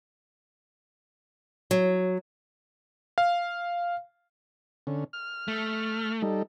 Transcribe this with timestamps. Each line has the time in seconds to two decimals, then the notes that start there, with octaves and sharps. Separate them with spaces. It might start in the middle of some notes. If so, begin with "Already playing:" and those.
1.71 F#3
3.18 F5
4.87 D3 C#4
5.13 F6
5.48 A3
6.22 G3 D#4 A4